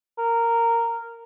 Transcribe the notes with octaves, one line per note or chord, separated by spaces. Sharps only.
A#4